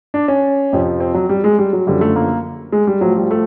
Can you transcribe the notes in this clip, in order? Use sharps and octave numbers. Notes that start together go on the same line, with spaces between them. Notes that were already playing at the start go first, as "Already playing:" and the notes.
D4
C#4
F2 C3 F3
C4
F#3
G3
G#3
G3
F#3
F#2 D3 F3 G3
A3
A#3
G#3
G3
A2 F3 F#3
G3
A3